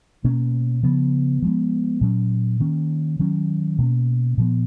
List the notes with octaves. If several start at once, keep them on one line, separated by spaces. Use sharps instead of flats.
B2 A#3 C#4
C#3 F3 B3
F3 G#3 B3
A#2 F#3 C#4
D#3 A#3 C#4
D#3 F#3 C#4
B2 A#3 C#4
A#2 F3 B3